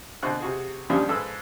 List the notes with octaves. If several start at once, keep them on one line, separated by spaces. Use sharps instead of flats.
B2 D3 C4 C#6 F#6
C3 F#4 G#4
F#2 A#2 D#3 F3 G3 D4
G#2 A4 B4 E6